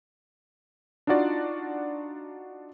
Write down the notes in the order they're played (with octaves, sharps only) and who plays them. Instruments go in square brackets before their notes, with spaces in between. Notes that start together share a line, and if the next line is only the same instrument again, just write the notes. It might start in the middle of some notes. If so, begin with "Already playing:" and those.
[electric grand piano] D4 D#4 F4 F#4 D5